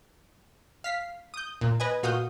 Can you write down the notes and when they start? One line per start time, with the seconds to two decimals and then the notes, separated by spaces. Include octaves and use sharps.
0.84 F5 B6 C7
1.34 D#6 G6
1.61 A#2
1.80 B4 D#5 G#5
2.03 A#2 F#4 F5 D#6 G6